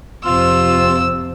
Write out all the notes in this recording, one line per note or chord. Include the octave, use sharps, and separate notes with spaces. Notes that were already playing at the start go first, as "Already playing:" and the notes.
F2 C3 F4 E6